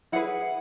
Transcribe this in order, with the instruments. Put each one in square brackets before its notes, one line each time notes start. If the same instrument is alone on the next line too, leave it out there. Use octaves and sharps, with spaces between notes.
[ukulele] E4 G#4 B4 F#5